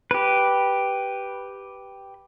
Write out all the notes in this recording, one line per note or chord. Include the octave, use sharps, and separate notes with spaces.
G4 B4